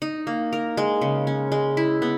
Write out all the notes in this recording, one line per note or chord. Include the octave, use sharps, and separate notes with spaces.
D#4
A#3
A#4
G#3
C#3
C#4
G#3
E4
B3